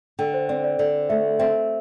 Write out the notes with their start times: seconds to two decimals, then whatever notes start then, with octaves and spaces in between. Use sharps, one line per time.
0.19 D3 G5
0.34 C5
0.49 C4 D5
0.64 D5
0.79 D3 D5
1.09 A3 E5
1.39 C4 E5